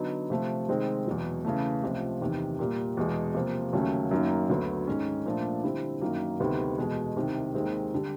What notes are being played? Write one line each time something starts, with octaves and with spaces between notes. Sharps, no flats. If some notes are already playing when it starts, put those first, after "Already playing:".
Already playing: D3 F#3 B3 D#4
C3 F3 A3
C3 D#3 G#3 C4
E2 B2 F#3
C#3 E3 A3
C#2 C3 F3 A3
E2 C3 D#3
A#2 G3 A#3
E2 B2 G#3
C3 F3 A#3
D#2 C#3 F#3 A3 C#4
F#2 D#3 F#3 A#3
D2 D3 F#3 B3
G#2 D#3 G#3 C#4
A#2 F3 A3 D4
D3 G3 C4 E4
F#2 D#3 F#3 A#3
D2 C3 D#3 G3 B3
E2 B2 G#3
C2 C3 D#3
D#2 D#3 G#3 C4
D3 G3